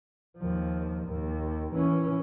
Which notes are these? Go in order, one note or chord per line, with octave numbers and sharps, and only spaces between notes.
D#2 F3
D#2
E3 C#4